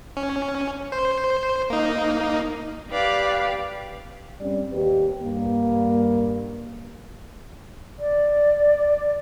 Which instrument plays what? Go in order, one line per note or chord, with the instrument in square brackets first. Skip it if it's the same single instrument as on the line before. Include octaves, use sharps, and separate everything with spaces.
[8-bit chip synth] C#4
C5
A#3 D#4
[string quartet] G4 B4 D5 F5
[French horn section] G2 G3 C4 C#4 D5
D#2 G4 B4
G2 A#3
[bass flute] D5